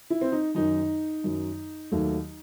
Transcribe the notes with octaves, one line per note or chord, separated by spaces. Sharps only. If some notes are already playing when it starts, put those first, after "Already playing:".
E4
C4
D#4
F#2 D#3 F#3 D#4
F#2 D#3 F#3
D#2 D#3 F#3 A3